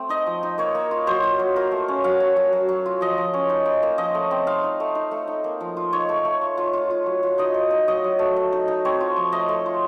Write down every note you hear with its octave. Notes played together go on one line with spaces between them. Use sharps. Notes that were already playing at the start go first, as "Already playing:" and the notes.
Already playing: A3 C4
D#4 D#5
F3
D#4
A#3 C#5
A#3
F4
F#3 C5
F4
F#3
F4 A#4
A3
C#4
F#3 F5
F#3
F#3
F#3
F#3
F4
F3 D#5
F3
C#4
D#4
D#4
A#3
F3 D#5
A3
C4
D#4 F5
D#4
A3
D#4
A3
D#4
A#3
F3
F4
D#4 C#5
A3
A3
F4
F4
F4
F4
F#3
F4
D#4 D#5
D#4
D#4
F#3 D#5
F#3
A3
A3
D#4
D#4
C4 C#5
F4
F3
A3 D#5
A3
F4